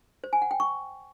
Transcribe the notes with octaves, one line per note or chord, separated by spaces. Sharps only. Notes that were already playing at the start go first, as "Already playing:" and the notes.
C5
G#5
F#5
G5
C#6